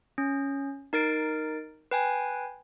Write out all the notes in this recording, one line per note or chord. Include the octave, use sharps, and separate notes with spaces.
C#4
D#4 A#4 A6 D7
B4 G5 G#5